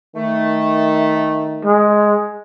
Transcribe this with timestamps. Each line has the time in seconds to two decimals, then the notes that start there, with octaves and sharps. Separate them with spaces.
0.16 D#3 A3
1.65 G#3